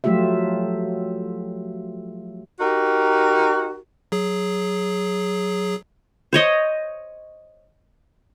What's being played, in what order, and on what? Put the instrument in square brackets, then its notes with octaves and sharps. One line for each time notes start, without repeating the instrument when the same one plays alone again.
[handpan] F3 F#3 A3 F4 G4 E5
[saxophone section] D#4 F#4 G4 A#4
[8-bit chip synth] F#3 G#4
[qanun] C5 C#5 D#5